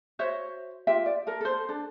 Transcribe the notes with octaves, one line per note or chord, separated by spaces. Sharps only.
F#4 C5 C#5 E5
F4 G4 E5
D5
A4 A#4
A4 C5
D4 A4